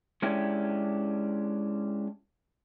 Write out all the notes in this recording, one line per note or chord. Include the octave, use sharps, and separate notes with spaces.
G#3 C#4 D4 E4 G4